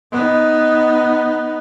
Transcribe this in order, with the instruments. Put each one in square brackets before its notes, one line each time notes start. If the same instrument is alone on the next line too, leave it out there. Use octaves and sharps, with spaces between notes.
[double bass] B3 D#4